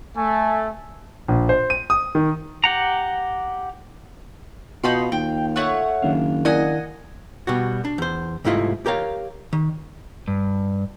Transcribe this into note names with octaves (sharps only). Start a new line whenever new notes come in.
A3 G#5
A#1
C5
D#7
D#6
D#3
G4 F#5 A#5
B2 D#4 F4 B5 C6
D#2 G5
A3 C#5 F#5
F#1 D#3 D4 F5
E4 A#4 D5 D#5 F#5 G#5
B2 G3 F#4
D4
E2 C5
C2 G#2 A3 E4 F4 D#5
G4 A#4 C#5 F5
D#3
G2